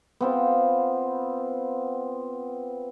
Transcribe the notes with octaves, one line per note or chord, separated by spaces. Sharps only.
B3 C4 F4